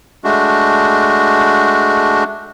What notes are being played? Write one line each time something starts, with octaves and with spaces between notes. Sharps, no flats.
G#3 A3 D4 F#4